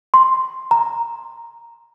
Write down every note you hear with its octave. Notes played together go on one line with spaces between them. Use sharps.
C6
A#5